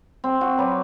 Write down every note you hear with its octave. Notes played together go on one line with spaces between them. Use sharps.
C4
F#4
F#3 B4 D5